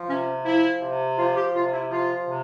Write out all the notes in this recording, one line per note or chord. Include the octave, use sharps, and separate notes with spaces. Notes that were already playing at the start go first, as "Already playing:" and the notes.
Already playing: F3
C3 C#4
F3 E4
C3
F3 F4
G4
C3 F4
E4
F3 F4
C3